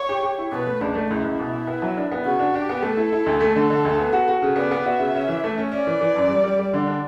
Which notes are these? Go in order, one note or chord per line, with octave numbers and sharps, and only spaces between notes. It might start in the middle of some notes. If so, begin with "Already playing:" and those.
Already playing: C#5
G4
G4
E4
B2 B4
A3
C#2 D4
A3
C#2 E4
C#2
B2
B2
B3
F#3
D4
B3
C#3 F#4
D4
D4 G4
B3
A3 A4
E4
E4
D2
A3
D3
D3
D2
B3
F#4
F#4
C#3
B3 D5
B3
F#4 E5
C#3
C#4
E3
A3
C#4
C#4 D5
E3
E3
F#2
G3
G3
G3
D3
D4